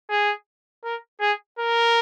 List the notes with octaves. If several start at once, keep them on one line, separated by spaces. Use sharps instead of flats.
G#4
A#4
G#4
A#4